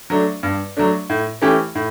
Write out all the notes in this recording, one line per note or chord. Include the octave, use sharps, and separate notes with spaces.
F#3 A3 D4
G2
F#3 A3 D4
A2
E3 A3 C#4 G4
A2